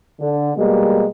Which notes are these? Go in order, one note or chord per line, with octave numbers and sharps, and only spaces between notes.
D3
B2 G3 G#3 A#3